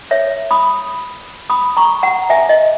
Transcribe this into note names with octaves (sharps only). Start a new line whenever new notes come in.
C#5 E5
B5 D#6
B5 D#6
A#5 C#6
F#5 A#5
C#4 G#4 B4 E5 G#5
D#5